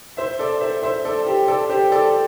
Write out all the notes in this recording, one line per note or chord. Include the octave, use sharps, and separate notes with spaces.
C5 E5
A4 D5
C5 E5
C5 E5
A4 D5
G4 C5
A4 D5
G4 C5
A4 D5